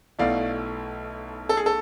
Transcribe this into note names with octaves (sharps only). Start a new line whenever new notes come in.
B1 B2 A3 E4 D5 F5
A4
G#4
A4